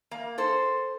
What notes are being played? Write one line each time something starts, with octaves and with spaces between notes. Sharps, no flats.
A#3
A4 C5